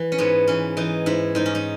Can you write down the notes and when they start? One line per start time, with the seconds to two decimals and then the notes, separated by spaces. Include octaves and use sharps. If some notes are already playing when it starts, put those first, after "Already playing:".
Already playing: E3
0.12 C#4
0.18 G#2 B3
0.48 E3 C#4
0.77 E3 D#4
1.06 G#2 E4
1.35 G#2 D#4
1.46 C#4
1.55 D#4